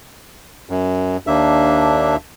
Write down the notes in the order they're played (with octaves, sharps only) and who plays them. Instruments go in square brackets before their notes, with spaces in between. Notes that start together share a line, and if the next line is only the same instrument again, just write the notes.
[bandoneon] F#2
[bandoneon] D#2 A#3 E5 [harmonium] D4